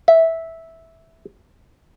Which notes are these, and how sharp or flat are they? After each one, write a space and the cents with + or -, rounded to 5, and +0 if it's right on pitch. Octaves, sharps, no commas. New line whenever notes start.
E5 -10